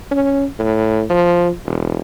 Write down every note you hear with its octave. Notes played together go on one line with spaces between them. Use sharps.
C#4
A2
F3
E1